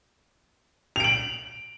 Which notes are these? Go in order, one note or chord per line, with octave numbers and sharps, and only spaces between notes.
D7 F7 F#7